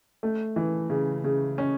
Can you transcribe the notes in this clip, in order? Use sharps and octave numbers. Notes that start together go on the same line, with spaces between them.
A3
E3
C#3
C#3
C#4